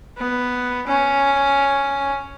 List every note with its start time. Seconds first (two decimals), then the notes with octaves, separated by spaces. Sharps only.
0.18 B3
0.87 C#4